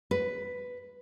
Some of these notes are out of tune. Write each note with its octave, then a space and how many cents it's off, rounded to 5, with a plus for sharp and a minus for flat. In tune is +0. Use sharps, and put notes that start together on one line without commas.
B4 +5